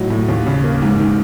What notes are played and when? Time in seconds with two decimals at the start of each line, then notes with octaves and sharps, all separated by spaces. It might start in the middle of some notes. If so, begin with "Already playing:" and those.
Already playing: A2 F#3 D#4
0.10 A2
0.28 D#2
0.47 C#3
0.64 A#3
0.82 G#2
1.00 D#3